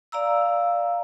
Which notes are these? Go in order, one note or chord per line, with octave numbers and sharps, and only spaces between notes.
D5 F5 A#5 E6